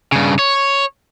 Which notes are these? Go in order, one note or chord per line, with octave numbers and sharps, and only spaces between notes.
G2 C#3
C#5